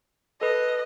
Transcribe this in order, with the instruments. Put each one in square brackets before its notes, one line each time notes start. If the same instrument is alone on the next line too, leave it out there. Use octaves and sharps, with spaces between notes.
[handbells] A4 B4 [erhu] D#5